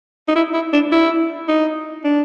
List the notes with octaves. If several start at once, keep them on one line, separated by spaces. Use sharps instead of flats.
D#4
E4
E4
D4
E4
D#4
D4